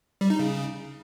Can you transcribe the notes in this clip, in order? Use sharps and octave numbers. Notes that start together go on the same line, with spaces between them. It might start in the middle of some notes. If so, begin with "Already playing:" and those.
G3
D#4
C#3